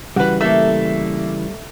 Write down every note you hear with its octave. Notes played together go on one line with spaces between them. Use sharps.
C#3 E3 G3 F#4 B4
A3 A#3 A4 E5